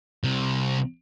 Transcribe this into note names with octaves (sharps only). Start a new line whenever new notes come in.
C2 C3